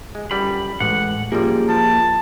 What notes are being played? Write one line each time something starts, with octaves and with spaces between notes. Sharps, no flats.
G#3
G1 F#2 G3 B5
A1 A2 G#3 F#5
F#2 F3 G3 A#3 F4 G4 G#4
F3 A5